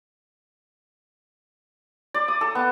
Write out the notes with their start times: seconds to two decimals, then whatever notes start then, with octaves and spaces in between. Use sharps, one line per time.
2.14 D5
2.28 D#6
2.41 A4
2.55 B3